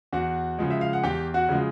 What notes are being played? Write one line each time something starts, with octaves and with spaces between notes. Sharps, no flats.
E2 F#4 F#5
C#3 F3 G#3
E5
F5
F#5
E2 G4 G5
F#4 F#5
C#3 F3 G#3